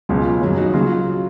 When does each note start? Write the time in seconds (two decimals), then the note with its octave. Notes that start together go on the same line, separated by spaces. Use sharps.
0.09 C#2 B2 F#3 F4 G#4
0.41 F#2 C#3 F#3
0.57 D#4 F#4
0.73 C#3 F#3 F4